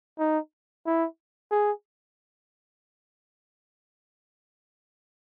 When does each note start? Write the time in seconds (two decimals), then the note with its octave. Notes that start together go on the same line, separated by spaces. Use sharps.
0.19 D#4
0.86 E4
1.51 G#4